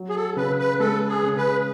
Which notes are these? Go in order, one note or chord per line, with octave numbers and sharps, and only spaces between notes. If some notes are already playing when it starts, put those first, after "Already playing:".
Already playing: F#3
G#4
A4
C#3 B4
B4
G#3 A4
G#4
C#3
B4